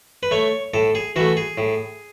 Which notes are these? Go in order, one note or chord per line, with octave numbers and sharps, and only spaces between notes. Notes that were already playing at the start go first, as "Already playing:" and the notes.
B4
A3 C#5
A2 A4
G#4
E3 A3 F#4
G#4
A2